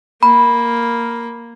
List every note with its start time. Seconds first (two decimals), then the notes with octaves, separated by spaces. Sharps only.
0.23 A#3 B5